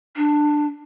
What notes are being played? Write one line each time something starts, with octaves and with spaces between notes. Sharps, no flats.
D4